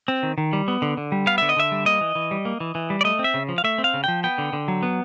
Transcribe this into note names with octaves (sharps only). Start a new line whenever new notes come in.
C4
D#3
D#3
G3
B3
D3
D3
G3
B3 F5
D3 E5
D#5
D3 E5
G3
A#3 D#5
E3
E3
G3
A#3
E3
E3
G3
D5
A3 D#5
C4
E5
C#3
F3
F5
A3 E5
C4
F5
C#3
F3 G5
B3 G5
D3
D3
F#3
B3